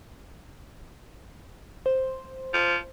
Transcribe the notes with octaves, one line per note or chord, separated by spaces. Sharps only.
C5
F3